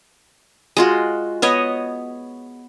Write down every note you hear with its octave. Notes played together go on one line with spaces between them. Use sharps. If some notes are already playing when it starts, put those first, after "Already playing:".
G#3 F4 F#4
B3 C#5 D#5